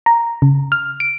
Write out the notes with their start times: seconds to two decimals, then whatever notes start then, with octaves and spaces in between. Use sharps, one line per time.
0.06 A#5
0.42 C#3
0.72 F6
1.00 D7